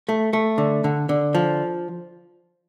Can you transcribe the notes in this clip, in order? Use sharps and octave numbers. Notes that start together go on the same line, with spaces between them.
A3
A3
D3
D3
D3
F3